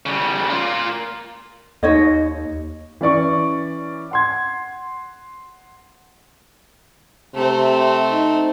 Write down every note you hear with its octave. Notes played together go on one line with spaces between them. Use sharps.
C#3 G3
A#3 F4
D#2 D#4 C#5 D#5
E3 C#4 D5 C#6
F#5 C6 G#6
C3 A3 C4
D#4